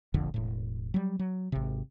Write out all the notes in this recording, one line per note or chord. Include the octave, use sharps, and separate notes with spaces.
E1 A#1 F2 D3
E1 A2
F#3 G3
F#3
G#1 C3